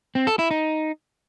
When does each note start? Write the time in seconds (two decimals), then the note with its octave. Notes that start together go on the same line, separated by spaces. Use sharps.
0.15 C4
0.27 A4
0.39 E4
0.51 D#4